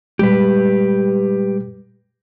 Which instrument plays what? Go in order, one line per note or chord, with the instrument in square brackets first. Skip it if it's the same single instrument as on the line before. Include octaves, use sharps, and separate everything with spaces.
[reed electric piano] A#2 G3 G#3 [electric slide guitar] G4 B4